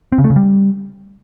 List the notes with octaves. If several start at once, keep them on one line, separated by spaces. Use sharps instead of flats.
C4
C#3
A3
C#3
G3